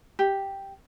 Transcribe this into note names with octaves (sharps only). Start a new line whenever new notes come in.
G4